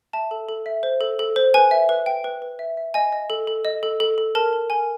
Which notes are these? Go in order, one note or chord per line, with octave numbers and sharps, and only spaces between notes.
E5 A5
A4
A4
E5
C5
A4
A4
C5
B4 G#5
E5
B4
G5
B4
B4
E5
E5
D#5 G#5
D#5
A4
A4
D#5
A4
A4
A4
A#4 A5
A#4
A#4 G#5